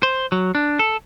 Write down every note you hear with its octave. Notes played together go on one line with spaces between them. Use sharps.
C5
F#3
D4
A4